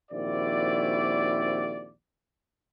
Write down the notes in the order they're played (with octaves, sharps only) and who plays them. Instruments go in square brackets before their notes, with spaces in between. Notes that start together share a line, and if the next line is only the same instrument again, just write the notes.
[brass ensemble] A#1 D#2 C4 E4 F#4 D5